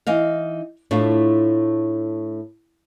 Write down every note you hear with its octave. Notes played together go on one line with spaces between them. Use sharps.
E3 D#4 D#5 F5
A2 A3 D4 F4